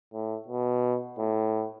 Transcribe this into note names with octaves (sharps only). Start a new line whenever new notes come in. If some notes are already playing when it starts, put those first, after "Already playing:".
A2
B2
A2